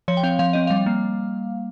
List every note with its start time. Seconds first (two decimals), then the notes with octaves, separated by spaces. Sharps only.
0.08 F3 C#5
0.17 G5
0.23 C4 F5
0.39 F3 F5
0.53 C4 D#5
0.67 G3 F5
0.86 A#3